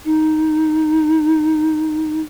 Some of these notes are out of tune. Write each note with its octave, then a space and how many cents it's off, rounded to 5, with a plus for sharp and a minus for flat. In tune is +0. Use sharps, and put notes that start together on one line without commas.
D#4 +0